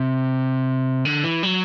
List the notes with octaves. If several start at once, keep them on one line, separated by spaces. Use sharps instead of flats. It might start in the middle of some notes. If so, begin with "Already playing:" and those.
Already playing: C3
D3
E3
F#3